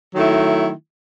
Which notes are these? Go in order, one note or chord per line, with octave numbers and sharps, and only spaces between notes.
D#3 F#3 A3 E4